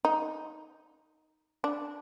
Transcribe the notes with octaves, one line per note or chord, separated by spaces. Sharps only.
D#4
D4